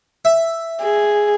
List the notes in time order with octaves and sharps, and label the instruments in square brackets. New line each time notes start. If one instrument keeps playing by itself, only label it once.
[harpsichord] E5
[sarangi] G#4